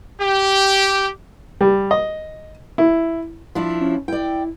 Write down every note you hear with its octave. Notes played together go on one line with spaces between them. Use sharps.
G4
G3
D#5
E4
F3 D4 E4
C#4
E4 D5 G5